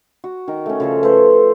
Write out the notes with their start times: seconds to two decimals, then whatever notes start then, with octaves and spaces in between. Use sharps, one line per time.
0.24 F#4
0.48 D#3 A#4
0.66 A3 C#4
0.80 C#3 F3 A4
1.03 A3 B4 C5